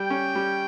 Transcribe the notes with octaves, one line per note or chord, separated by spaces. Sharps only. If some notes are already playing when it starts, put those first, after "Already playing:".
Already playing: G3 G5
C#4
G3